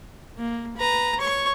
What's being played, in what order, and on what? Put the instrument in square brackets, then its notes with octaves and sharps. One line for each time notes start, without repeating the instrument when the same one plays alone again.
[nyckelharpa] A#3
B4 A#5
C#5 C#6